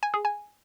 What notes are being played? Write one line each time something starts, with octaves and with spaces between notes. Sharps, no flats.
G#5
G#4
G#5